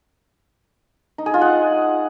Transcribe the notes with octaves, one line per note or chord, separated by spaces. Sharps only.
D#4
G#4
F4
F#5